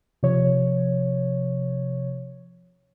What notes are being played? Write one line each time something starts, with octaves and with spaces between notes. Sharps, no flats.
C3 F3 C#5